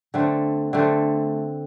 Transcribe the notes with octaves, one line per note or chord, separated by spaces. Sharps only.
D3 A3 C4
D3 A3 C4